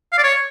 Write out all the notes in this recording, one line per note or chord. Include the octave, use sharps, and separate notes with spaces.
F5
D5
C#5